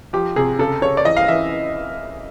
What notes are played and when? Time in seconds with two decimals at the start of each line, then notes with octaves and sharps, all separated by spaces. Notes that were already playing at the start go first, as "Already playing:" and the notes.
0.13 F3 G4
0.36 C3 G#4
0.59 C#3 A4
0.82 C#3 C#5
0.97 D5
1.05 E3 D#5
1.17 F5
1.28 E3 E5